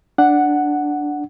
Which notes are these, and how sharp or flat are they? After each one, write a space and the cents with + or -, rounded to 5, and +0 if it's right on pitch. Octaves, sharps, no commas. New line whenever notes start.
D4 +0 F#5 +0